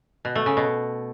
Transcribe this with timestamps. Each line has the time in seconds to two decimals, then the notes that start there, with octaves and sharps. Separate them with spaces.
0.25 B2
0.35 A3
0.46 C#3
0.57 B2